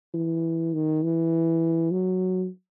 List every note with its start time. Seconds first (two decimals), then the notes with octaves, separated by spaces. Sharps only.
0.14 E3
0.74 D#3
1.03 E3
1.91 F#3